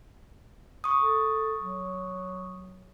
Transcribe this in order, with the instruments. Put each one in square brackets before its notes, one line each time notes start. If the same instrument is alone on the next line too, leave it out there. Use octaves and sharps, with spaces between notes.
[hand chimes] C#6 D#6
[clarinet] A4
F#3